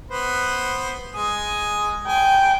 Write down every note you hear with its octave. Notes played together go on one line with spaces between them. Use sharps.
B3 B4 C5
G#3 G#5 D#6
G5 G#5